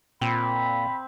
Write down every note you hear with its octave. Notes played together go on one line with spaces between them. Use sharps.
A#2 C4 B5